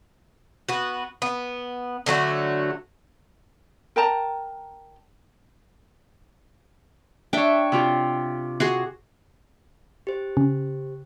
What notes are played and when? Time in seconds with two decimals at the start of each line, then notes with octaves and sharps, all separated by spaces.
0.68 B3 F#4
1.22 B3
2.06 D3 F#3 A3 F#4
3.96 A#4 G5 A5 A#5
7.33 D4 C#5 E5 G5
7.72 C3 F4 G4
8.60 F#4 G#4 C6
10.07 G4 C5
10.37 C#3